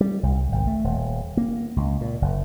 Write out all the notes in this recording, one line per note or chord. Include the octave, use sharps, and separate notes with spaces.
G3
C2
G#1
A3
D#1
A#3
C#2
A#2
F#1